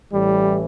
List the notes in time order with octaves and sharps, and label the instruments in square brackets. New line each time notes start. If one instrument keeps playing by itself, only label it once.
[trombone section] A1 A2 E3 G3